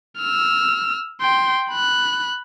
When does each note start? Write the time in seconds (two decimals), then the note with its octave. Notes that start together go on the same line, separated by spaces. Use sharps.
0.19 E6 F6
1.21 G5 C6
1.71 B5 F#6